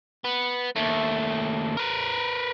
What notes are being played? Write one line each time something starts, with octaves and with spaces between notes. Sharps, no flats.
B3
D#2 A3
A#4 B4